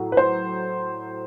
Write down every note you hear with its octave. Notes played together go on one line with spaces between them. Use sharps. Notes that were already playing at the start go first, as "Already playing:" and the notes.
Already playing: A2 F#3
B4
C5